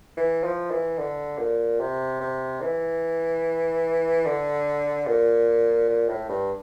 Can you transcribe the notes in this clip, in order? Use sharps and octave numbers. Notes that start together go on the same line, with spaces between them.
E3
F3
E3
D3
A#2
C3
C3
E3
D3
A#2
A#2
A2
G2